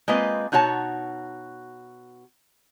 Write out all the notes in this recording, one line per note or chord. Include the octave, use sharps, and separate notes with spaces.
G#3 A#3 C4 F4 B4 D#5
B2 D#4 F#4 C#5 A5